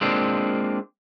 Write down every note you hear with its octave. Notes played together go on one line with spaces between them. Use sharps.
G#3 A#3 C4 D4 F4